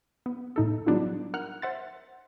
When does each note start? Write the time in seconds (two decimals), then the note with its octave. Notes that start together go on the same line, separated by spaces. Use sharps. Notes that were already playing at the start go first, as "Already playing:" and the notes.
0.26 B3
0.56 A2 D#4 A4
0.87 F#3 G3 B3 D4 D#4 F4
1.34 A#4 F#5 F6 F#6
1.62 C5 E5 F#5 C6 A6